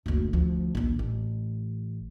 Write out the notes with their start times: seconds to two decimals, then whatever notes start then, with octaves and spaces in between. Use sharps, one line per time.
0.06 F#1 D2
0.33 D2 F3
0.75 A#1 D#2
0.99 A1